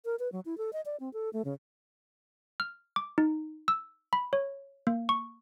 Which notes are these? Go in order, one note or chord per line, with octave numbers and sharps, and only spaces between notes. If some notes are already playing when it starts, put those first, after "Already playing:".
A#4
B4
F#3
E4
A4
D#5
D5
C4
A4
A3
C#3
F6
D6
D#4
E6
B5
C#5
A#3
C#6